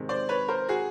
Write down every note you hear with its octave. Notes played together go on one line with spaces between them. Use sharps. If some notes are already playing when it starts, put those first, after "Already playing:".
Already playing: C3 D#3 G#3
C5 D5
B4 C#5
A#4 C5
F#4 G#4